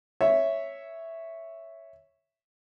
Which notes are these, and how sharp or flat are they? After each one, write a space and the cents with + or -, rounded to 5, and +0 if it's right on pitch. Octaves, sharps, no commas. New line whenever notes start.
C#5 +0 E5 +0